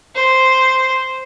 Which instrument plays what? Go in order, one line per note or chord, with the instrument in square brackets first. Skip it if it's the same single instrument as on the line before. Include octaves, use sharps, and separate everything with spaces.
[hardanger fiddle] C5